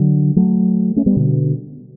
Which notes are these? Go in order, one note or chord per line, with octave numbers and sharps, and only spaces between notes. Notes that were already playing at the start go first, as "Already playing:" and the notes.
Already playing: D3 F#3
F#3 A3
A3 C#4
G3 B3
B2 D3